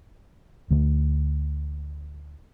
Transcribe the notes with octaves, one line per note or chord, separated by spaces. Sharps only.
D2 D3 A3